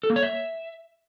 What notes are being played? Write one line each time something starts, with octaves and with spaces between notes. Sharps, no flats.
A4
A#3
C#5
E5